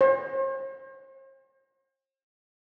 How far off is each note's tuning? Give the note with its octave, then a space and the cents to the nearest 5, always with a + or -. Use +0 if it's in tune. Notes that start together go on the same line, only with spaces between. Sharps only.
C5 +45